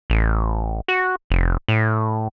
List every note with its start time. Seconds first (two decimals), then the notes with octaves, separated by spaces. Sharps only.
0.10 A1
0.88 F#4
1.30 F1
1.68 A2